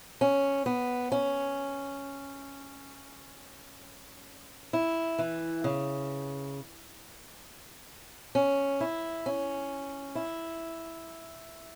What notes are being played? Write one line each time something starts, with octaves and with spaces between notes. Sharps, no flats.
C#4
B3
C#4
E4
E3
C#3
C#4
E4
C#4
E4